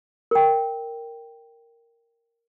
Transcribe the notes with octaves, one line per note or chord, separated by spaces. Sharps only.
A#4 G5